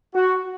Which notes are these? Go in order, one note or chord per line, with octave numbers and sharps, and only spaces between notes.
F#4